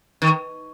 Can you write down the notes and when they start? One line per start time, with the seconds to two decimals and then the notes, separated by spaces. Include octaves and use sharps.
0.22 D#3